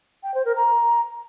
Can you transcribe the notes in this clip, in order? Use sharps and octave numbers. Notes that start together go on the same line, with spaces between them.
G5
C5
A#4
A#5